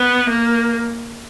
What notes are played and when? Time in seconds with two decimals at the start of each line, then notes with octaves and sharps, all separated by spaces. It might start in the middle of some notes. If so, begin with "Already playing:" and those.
Already playing: B3
0.29 A#3